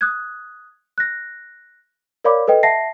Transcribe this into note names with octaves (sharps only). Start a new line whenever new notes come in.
D#6 F#6 G#6
F#6 A#6
A#4 C#5 D5 F5 B5 D6
A4 B4 D#5 G5
E5 F#5 A5 A#6 C7